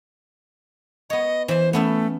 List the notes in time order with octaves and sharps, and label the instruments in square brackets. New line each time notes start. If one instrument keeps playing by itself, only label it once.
[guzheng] B3 C#5 [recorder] D#5
[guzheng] E3 E5 [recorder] C5
[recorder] A3 [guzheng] B3 C#4 E4